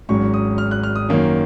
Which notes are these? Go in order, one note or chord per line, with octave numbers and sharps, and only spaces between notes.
G#1 G#2 F#3 C#4 C#6
D#6
F6
F#6
F6
D#6
F#2 D#3 A#3 C#4